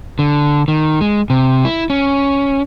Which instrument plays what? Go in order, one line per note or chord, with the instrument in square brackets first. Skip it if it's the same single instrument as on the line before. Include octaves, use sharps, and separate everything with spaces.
[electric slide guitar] D3
D#3
G#3
C3
E4
C#4